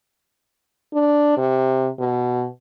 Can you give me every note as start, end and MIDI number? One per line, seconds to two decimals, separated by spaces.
0.94 1.37 62
1.37 1.88 48
1.99 2.46 47